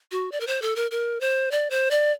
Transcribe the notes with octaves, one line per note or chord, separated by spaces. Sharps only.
F#4
D5
A#4
C5
A4
A#4
A#4
C5
D5
C5
D5